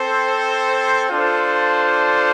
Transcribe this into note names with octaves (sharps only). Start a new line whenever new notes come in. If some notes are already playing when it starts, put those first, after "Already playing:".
Already playing: C4 A4 C5
D4 F4 A4 C5